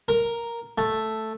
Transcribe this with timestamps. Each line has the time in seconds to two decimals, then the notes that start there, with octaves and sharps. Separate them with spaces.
0.08 A#4
0.78 A3